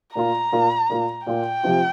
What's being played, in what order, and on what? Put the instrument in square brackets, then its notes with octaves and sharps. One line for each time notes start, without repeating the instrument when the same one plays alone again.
[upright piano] A#2 A#3 F4 [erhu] A#5
[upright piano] A#2 A#3 F4
A#2 A#3 F4
[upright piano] A#2 A#3 F4 [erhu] G5
[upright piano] C3 F3 C4 F4